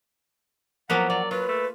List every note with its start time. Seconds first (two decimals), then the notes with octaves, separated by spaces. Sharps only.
0.90 F3 F#3 A#3 B3 F#5
1.10 F#3 D5
1.31 F#3 F4 B4
1.49 A3